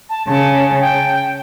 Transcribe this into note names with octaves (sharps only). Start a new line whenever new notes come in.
A5
C#3 A5
G5